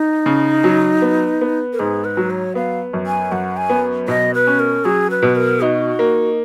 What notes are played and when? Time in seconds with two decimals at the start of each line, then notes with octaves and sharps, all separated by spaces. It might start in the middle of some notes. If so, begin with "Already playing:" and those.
Already playing: D#4
0.26 C#3
0.64 F#3
1.02 B3
1.41 B3
1.73 A#4
1.79 G#2 G#4
2.04 B4
2.17 F#3
2.30 C#5
2.55 B3 F5
2.93 F#2
3.07 G#5
3.31 F#2 F#5
3.57 G#5
3.70 B3
4.08 B2 D#5
4.34 B4
4.47 C#4
4.60 A#4
4.85 F#3 G#4
5.10 B4
5.22 B2
5.36 A#4
5.61 D#4 F#4
5.99 A#3